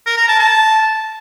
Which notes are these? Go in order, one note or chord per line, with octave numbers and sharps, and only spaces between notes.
A#4
A#5
A5
A5